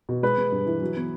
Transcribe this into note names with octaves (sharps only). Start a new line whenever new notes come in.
B2
G#3 B4
G#3
G2
E3
F#3
B3